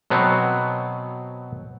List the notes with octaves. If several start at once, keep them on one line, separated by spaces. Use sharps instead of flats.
B2 F#3 B3 C4